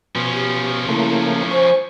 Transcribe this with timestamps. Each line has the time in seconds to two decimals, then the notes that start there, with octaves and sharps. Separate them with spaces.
0.15 B2 F3 C#4
0.34 G4
0.88 C#3 A3 A#3 E4
1.51 C5 G#5 C#6